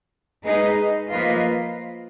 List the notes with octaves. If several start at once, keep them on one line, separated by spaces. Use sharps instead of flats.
G#3 D#4 G#4 B4 D#5
F3 A#3 F4 B4 D#5